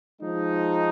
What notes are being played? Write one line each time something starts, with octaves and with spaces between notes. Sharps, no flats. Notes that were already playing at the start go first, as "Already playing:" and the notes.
F3 G#3 D#4